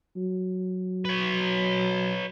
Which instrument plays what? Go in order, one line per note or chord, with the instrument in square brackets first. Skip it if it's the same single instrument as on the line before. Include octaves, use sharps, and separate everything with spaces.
[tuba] F#3
[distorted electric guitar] B4 C#5